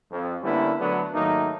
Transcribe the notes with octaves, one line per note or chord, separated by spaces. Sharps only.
F2
D3 G3 A#3 B3 C#4 E4
D3 F#3 A3 B3 D4
G#2 D#3 F#3 A3 A#3 D#4